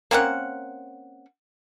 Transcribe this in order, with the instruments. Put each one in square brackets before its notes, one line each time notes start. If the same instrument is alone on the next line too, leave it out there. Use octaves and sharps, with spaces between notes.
[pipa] A#3 C4 C#4 F#5